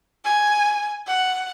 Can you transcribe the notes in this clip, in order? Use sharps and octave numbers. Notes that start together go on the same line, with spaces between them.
G#5
F#5